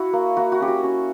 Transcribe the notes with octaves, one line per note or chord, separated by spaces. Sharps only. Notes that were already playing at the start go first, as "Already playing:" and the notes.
Already playing: E4 F#4
A#3
A#3 F#4
F#4
C#4 G4
F#4
C#4